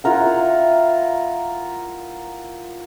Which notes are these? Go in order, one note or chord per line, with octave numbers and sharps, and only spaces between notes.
E4 F4 A#4 F#5